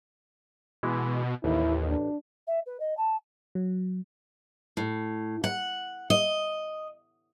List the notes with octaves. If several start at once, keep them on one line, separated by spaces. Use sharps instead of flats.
B2 E3 G#3 E4
A1 D#2 E4
D4
E5
B4
D#5
A5
F#3
A2
F#5
D#5